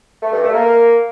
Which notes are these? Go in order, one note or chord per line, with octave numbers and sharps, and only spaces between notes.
A3
G2
A3
A#3